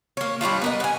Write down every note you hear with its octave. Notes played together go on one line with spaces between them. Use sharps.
A#3 C#5
G3 C#4 D4 F4
B3 A#4 D#5
F#5 G#5